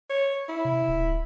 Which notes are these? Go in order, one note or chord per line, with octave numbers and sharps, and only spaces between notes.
C#5
E4
C3
D1